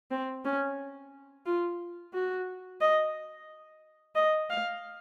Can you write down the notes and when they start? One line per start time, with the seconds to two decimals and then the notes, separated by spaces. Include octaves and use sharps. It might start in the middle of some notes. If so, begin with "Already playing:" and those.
0.11 C4
0.45 C#4
1.46 F4
2.13 F#4
2.81 D#5
4.15 D#5
4.50 F5